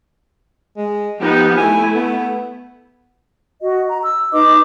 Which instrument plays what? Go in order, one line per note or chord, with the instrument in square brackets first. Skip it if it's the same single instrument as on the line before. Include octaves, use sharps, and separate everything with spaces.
[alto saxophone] G#3
[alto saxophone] F3 [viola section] B3 D#4 G4
[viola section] A3 E4 [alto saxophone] G#5
[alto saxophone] B3
[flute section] F#4 D#5
A#5
E6
D#4 B4 D#5 D6